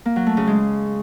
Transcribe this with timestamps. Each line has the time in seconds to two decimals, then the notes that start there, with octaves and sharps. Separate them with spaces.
0.05 A#3
0.16 F#3
0.26 A3
0.37 C#3
0.47 G#3